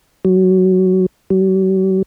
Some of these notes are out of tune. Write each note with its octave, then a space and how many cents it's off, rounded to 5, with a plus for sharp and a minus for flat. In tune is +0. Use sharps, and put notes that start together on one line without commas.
F#3 +10
F#3 +45